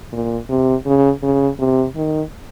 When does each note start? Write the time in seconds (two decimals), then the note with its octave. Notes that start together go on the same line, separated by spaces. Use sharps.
0.12 A#2
0.49 C3
0.85 C#3
1.23 C#3
1.59 C3
1.96 D#3